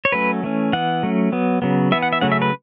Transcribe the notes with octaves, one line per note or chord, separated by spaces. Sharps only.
C#5
F#3 A3 C#4 B4
E3 A3 C#4
E3 B3 F#5
F#3 A3 C#4
F#3 B3
C#3 F#3 B3
E3 B3 E5
F#5
E5
C#3 F#3 A3 C#4 F#5
E5
B4